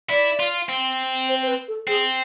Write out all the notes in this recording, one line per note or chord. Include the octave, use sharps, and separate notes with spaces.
E4 D5
F4
C4
C5
C5
B4
A4
C4 G#4